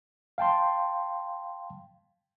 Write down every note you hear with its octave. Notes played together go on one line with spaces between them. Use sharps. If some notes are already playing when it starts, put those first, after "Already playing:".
F5 G5 A5 C6